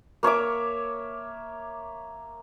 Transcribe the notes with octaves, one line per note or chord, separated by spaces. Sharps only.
A#3 C#5 E5 D6